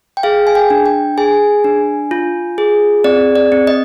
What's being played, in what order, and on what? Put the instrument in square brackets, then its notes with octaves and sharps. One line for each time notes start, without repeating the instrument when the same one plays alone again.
[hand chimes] G5
G#4 F5
G#5
G5
D4
G5
G#4 G#5
D4
F4
G#4
C4 D5
D5
C4
D#5